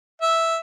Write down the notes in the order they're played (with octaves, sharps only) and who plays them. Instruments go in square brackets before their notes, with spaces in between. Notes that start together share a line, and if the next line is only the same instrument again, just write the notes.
[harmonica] E5